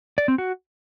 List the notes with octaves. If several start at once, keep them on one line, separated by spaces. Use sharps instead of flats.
D5
C4
F#4